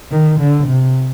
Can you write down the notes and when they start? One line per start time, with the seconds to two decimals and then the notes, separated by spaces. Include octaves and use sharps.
0.11 D#3
0.40 D3
0.67 C3